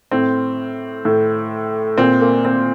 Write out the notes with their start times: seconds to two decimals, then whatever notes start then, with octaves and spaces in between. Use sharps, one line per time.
0.11 A2 C4
1.05 A2
1.98 A#2 C4
2.21 A#3
2.45 C4